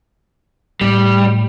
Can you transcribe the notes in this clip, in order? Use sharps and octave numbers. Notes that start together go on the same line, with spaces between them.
A2 G3